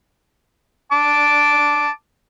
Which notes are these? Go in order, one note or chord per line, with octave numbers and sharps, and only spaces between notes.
A5 D6